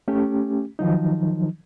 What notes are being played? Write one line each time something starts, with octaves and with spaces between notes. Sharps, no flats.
A3 C#4 G4
D#3 F3 F#3 D#4